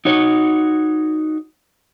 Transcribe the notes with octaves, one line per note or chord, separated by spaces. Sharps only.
D#4 F#4 C#5